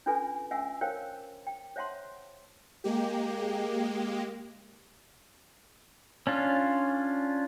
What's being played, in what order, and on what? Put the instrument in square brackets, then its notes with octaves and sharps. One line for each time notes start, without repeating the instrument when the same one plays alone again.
[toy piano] C#4 D4 F4 A4 B4 G#5
C#4 E5 F#5 G#5 E6
A#4 C5 C#5 F5 G5
G5
C5 C#5 E5 F#5 A5 C6
[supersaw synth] G#3 A#3 G4
[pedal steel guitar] C#4 D4 F4